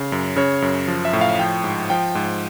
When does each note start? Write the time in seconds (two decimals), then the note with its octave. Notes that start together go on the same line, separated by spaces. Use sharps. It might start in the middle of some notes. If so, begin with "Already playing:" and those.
Already playing: C#3
0.12 F#2
0.36 C#3 C#5
0.62 F#2
0.88 F3
1.05 E5
1.13 A2
1.21 F5
1.39 F3 G5
1.64 G#2
1.90 F3 G5
2.15 G#2